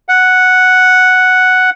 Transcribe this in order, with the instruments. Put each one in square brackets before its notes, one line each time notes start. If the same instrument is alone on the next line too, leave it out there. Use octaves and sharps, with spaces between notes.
[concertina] F#5